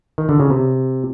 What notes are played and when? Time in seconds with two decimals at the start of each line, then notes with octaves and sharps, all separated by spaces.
0.18 D#3
0.29 D3
0.40 C#3
0.50 C3